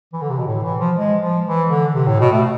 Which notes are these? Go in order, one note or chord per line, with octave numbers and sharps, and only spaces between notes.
E3
D3
C3
B2
A2
E3
F3
G#3
F3
E3
D3
C3
A2
B2
A3